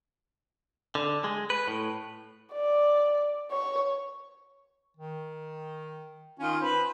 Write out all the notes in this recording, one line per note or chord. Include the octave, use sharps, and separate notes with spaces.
D3
G#3
B4
A2
D5
C#5
D#3
D#3 C#4 F4
B4 C5